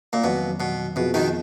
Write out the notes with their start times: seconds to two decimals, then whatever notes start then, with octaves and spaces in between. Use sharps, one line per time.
0.13 A#2
0.24 F2 B2 D#3 F#3
0.60 B2
0.96 F2 B2 F3 B3 F4 G#4
1.14 B2 D#3